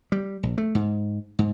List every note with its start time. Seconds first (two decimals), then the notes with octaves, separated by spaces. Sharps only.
0.12 G3
0.43 A#1
0.58 A3
0.75 G#2
1.39 G#2